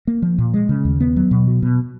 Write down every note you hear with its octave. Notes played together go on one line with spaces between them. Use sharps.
A#3
F3
A#2
G#3
C#3
D#2
B3
F#3
B2
F#3
B2